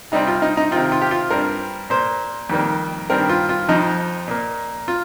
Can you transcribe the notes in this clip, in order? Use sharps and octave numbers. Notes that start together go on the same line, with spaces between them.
C3 G3 C4 D#4
F4
D#4
D#4
C3 D#3 C4 F4
F4
G4
F4
G2 G3 C4 A#4
A#2 A#3 C5
F2 D#3 G3 A#3
G2 D#3 G3 C4 A#4
F4
F4
F2 F3 C4 D#4
A#2 A#3
F4